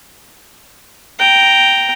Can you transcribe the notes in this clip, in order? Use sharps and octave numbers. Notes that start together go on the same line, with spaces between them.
G5 A#5